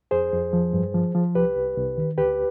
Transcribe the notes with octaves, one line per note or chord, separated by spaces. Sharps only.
F2 G#4 C5
F2
F3
G2
F3
F3
C2 G4 B4
C2
C2
D#3
D2 G4 B4